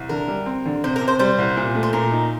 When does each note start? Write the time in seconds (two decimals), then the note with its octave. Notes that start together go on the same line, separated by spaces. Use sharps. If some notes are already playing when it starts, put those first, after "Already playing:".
Already playing: C2
0.09 D3 A#4
0.28 G3
0.46 C4
0.65 D3
0.84 C3 C5
0.96 A#4
1.01 C3
1.08 C5
1.19 G3 C5
1.38 C2
1.57 A#2
1.75 A3
1.83 C5
1.93 A#2 A#4
2.11 D#4